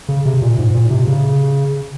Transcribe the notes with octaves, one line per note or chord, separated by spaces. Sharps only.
C#3
C3
A#2
G#2
A#2
C3
C#3